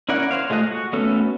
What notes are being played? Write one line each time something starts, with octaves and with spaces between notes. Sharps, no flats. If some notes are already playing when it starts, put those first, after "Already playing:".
C#4 E4 A#4 D5 F#5
C5 C#5 F5
G#3 A3 F4 D#5 F#6
F#4
A3 B3 C#4 F#4 A4